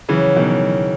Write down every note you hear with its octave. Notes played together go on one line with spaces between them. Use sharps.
C#3 E3 F#3
B2 D#3 F#3
F#3